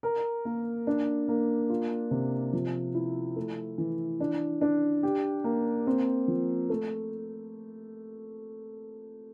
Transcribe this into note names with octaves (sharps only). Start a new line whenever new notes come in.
A#4
A#3
D4
A#3
F4
C3
F3
E4
A3
E3
D4
D4
G4
A#3
C4
F3
A3